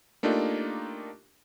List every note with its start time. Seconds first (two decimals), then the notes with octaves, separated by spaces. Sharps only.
0.23 A3 A#3 D4 D#4 F4 G4